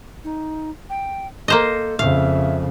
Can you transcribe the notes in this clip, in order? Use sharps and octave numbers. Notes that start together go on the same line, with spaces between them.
D#4
G5
A#3 A4 C5 D#5
F2 C#3 E5 F5